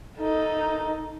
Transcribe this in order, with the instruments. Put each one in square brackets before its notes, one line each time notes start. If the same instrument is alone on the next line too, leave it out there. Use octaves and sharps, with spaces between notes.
[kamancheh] D#4 A4